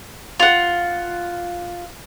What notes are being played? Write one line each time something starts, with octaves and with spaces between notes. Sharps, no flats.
F4 F#5